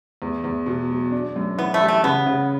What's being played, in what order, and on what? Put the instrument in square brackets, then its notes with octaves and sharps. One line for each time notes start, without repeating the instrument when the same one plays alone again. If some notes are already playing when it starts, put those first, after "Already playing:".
[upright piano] E2
E2
B2
F#3
D4
F#2
[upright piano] E3 [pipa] B3
[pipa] A3
[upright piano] G3
[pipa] A3
[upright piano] C#3 [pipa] B3
[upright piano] C#3